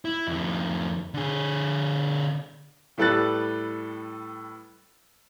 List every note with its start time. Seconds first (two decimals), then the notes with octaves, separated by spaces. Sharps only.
0.05 E4
0.28 F2 D#3
1.14 D3 G#4
2.98 A2 G3 A4 B4 F#6 A6